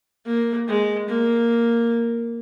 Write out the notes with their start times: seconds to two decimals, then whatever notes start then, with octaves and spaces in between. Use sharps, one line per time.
0.26 A#3
0.67 G#3
1.08 A#3